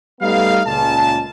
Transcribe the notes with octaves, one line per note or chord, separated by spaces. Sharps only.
G3 A3 B3 D#4 F5
C#2 A#2 A5